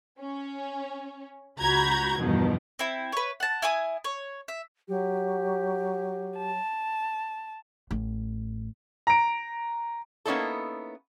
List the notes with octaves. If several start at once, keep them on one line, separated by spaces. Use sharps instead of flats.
C#4
C#2 F#4 A#5 B5 G6 G#6
E2 G2 B2 D#3 F3
C4 E4
B4 C#5
F#5 A5
E4 G#5 D#6
C#5
E5
F#3 G4
A5
A1
A#5 D7
A#3 B3 C#4 D#4 E4 A4